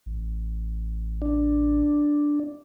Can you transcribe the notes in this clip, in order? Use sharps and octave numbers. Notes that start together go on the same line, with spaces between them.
A1
D4